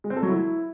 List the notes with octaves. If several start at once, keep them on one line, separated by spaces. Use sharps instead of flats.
G#3
C4
A4
F#3
E4